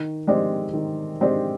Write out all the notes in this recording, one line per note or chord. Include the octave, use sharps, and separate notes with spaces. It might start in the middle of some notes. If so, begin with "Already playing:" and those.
Already playing: D#3
G#3 C4 G4 D5
D#3
G#3 C4 G4 D5